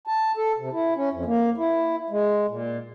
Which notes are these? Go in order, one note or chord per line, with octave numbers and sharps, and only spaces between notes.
A5
A4
C3
E4
C#4
F2
A#3
E4
G#3
A#2